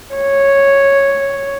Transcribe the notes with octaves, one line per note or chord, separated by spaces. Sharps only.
C#5